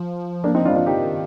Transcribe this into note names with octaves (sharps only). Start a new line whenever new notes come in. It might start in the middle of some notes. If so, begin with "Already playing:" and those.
Already playing: F3
A#3 D4
C4 D#4
D4 F4
G3
F3 D4 F4
D#3 D#4 G4